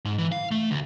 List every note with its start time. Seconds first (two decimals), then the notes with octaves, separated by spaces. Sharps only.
0.05 G#2
0.18 E3
0.32 F5
0.51 A3
0.71 D2